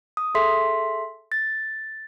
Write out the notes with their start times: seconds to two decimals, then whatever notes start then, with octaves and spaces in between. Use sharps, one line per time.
0.17 D#6
0.35 G#4 A4 E5 C6 B6
1.32 A6